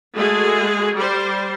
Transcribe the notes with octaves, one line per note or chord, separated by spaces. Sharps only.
G#3 A3 F#4 G#4
G3 C5